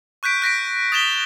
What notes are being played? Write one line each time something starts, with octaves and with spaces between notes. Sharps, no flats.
C#6 F#6 G6 B6 D7
F#6 A#6 B6 D7
D#6 A6 B6 E7 F7 G7